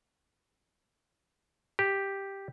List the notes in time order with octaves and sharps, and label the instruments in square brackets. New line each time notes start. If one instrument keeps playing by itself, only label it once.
[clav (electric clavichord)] G4